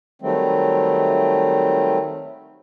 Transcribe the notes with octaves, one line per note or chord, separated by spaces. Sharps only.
D#3 F#3 G3 A3 C4